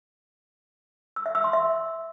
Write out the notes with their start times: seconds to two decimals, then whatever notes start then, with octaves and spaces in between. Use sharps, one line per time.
1.16 E6
1.26 E5
1.35 E6
1.44 C6
1.53 E5